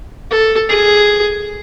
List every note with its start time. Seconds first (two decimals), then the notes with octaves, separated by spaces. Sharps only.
0.31 A4
0.69 G#4